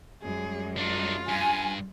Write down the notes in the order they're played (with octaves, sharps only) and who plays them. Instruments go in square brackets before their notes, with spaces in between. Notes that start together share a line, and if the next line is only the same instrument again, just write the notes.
[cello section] F#2 G3 G#3 [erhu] G#4
[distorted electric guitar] D4 D#4 [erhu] F4
[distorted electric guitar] G2 [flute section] G#5